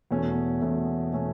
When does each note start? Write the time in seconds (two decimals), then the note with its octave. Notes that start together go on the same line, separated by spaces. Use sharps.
0.11 E2 B2 A3 C#4
0.61 E2 B2 A3 C#4
1.13 B2 A3 C#4